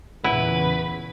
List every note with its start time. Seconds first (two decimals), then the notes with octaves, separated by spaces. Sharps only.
0.24 E2 A#2 C#3 E4 B4 F#5